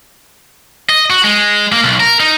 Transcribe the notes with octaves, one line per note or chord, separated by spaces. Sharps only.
D#5
F#4
G#3
A#3
B1
A#4
D#4